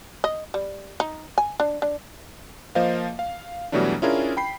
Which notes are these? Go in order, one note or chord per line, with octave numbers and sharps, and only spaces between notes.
D#5
G3
D#4
G#5
D4
D4
F3 A#3 C5 D#5 F5
F5
B2 E3 F#3 G3 A3 D4
C#4 D4 E4 F4 G#4 A#4
G5 B5 C7